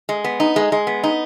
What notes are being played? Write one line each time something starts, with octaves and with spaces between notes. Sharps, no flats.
G#3
B3
D#4
G#3
G#3
B3
D#4